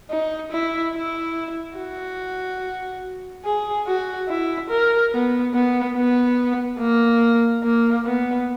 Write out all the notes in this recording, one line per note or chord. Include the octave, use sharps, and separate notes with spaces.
D#4
E4
E4
F#4
G#4
F#4
E4
A#4
B3
B3
B3
A#3
A#3
B3